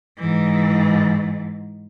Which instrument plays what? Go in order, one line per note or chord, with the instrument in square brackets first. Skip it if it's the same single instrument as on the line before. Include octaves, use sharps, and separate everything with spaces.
[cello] G#2 E3